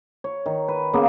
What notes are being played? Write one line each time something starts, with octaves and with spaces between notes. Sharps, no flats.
C#5
D#3
B4
C#3 A#3 B3